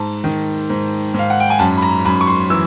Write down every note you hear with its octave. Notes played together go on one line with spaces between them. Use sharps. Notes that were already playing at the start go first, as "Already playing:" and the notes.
Already playing: G#2 A5
D#3
G#2
G#2 F5
F#5
G5
G#5
F#2 A5
B5
A#5
F#2 B5
C#6
C6
E3 E6